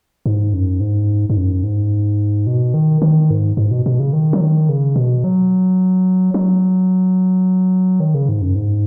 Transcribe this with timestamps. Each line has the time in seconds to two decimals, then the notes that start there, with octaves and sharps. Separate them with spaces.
0.26 G#2
0.53 F#2
0.80 G#2
1.30 G#2
1.37 F#2
1.63 G#2
2.47 B2
2.74 D#3
3.02 D#3
3.31 G#2
3.57 G#2
3.71 B2
3.86 B2
3.99 C#3
4.13 D#3
4.33 F#3
4.41 D#3
4.69 C#3
4.96 B2
5.24 F#3
6.34 F#3
8.00 D#3
8.14 C#3
8.29 G#2
8.42 F#2
8.55 G#2